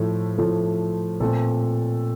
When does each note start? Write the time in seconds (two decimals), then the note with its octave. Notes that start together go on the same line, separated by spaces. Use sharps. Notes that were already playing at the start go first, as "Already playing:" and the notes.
Already playing: A2 F3 A3
0.38 A2 F3 A3
1.20 A#2 A3 C4 A4